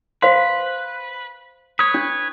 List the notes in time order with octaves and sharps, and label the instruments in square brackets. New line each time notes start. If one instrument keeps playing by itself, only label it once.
[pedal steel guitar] B4 [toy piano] C5 F5 C6
[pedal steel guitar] B4 C#5 [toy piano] D#6
[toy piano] D4